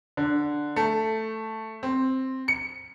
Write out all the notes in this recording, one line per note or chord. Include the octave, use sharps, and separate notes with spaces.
D3
A3
C4
C#7